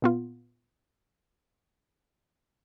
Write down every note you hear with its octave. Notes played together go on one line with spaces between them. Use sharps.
A#2 B3 F4